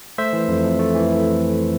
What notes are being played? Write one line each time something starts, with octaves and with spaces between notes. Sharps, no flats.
A3 C5 E5
E3
F2
F2
A3
E3